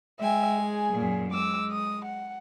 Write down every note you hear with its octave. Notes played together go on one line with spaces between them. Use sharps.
G#3 E5 G5 G#5
G#4
F#2 A#2
G#3 D6 E6
D#6
F#5